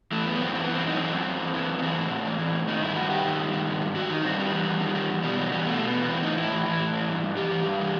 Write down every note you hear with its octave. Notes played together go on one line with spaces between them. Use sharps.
E3 A3
F#2 B3
F#2 C4
E3 C4
E3 B3
C4
F#2 D#4
E3 C4
F#2
F#2
E3
E3
F#2
B3
E3 C4
A2
A2
E3
E3
A2
D#3 D#4
G2 E4
G2 F#4
D#3 G4
D#3
G2
D#3
G2
G2
D#3 F#4
D#3 D#4
G2 C4
D#3 G3
E2
E2
D#3
D#3
E2
B2 G3
E2 F#3
E2 G3
B2 A3
B2
B3
E2
E3 C4
A2 D#4
A2 E4
E3
E3
A2
E3
G2
G2
E3 G4
E3
G2
E3